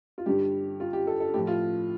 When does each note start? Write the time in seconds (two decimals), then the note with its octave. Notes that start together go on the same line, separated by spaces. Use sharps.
0.18 F4
0.26 G2 D3 G3 G4
0.80 F4
0.93 G4
1.07 A4
1.20 A4
1.34 A2 F3 G4
1.47 F4